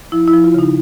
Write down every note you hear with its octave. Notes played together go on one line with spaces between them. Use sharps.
F3 E4
E4
F3
F4
C#3 D#4